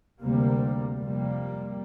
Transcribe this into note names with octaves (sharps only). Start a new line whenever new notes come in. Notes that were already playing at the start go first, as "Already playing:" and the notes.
D2 C3 G3 A#3
F2 C3 G3 A#3